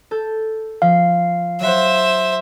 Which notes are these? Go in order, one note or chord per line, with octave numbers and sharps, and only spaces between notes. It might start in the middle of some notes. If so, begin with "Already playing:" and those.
A4 G6
F3 F5
F#3 C5 E5 F#5